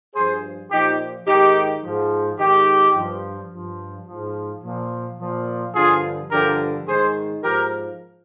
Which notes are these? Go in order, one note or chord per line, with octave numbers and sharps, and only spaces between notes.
G2 F3 G#4 C5
A#2 F3 D#4 G4
G#2 D#3 D#4 G4
G#2 F3
G#2 D#3 D#4 G4
G2 F3
G2 F3
G#2 F3
A#2 F3
A#2 F3
G2 D3 F3 F4 G#4
G2 D3 F3 G4 A#4
G#2 D#3 G#4 C5
G#2 F3 G4 A#4